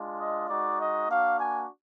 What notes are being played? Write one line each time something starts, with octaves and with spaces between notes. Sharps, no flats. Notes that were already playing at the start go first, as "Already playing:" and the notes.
Already playing: G#3 D4 F4
D#5
G#3 D#4 F#4 D5
D#5
A#3 D4 F#4 F5
G#5